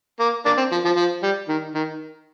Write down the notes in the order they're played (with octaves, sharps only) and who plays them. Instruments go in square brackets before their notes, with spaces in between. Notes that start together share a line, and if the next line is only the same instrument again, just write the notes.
[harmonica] A#3
A#3 D4
C4
F3
F3
F3
G3
D#3
D#3